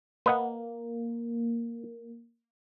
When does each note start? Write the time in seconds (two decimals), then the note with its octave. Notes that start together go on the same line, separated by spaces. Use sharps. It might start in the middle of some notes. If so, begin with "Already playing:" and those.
0.26 A#3 B4 D#5 F#5